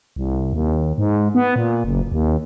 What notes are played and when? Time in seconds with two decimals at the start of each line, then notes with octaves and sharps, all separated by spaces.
0.16 C2
0.53 D#2
0.98 G#2
1.35 B3
1.56 A#2
1.84 F#1
2.12 D#2